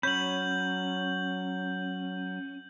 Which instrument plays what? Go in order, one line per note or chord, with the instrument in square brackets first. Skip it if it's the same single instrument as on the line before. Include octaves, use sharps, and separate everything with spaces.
[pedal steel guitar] F#3 C#5 B5 [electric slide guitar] C#4 [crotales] G6 F#7